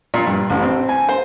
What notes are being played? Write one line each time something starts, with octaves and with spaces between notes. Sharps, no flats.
A#2
G2
A1
C4
G#5
C5